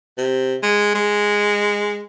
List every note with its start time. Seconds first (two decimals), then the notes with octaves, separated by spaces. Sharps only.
0.18 C3
0.63 G#3
0.95 G#3